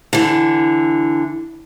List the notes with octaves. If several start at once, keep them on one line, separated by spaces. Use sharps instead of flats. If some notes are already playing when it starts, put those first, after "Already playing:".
D3 E3